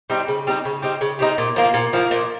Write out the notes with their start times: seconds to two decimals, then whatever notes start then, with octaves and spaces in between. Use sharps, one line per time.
0.10 G3 C4 D#4
0.28 C#3
0.47 G3 C4 D#4
0.65 C#3
0.82 G3 C4 D#4
1.01 C#3
1.19 G3 C4 D#4
1.38 A#2
1.56 F3 A#3
1.74 A#2
1.93 F3 A#3
2.11 A#2